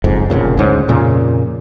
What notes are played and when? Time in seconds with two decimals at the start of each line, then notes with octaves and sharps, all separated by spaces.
0.04 F#1 F2 G#2
0.30 F1 A#1 A#2 C#3
0.57 D2 G#2 C#4
0.88 F2 A#2 C#3